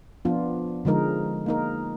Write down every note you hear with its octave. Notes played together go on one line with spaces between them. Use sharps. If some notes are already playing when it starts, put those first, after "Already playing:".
F3 B3 D4 F4
D3 F3 G#3 D#4 A#4
A#3 D#4 A#4